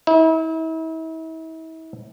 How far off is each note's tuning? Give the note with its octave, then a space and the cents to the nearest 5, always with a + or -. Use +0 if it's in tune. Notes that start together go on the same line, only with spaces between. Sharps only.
E4 -40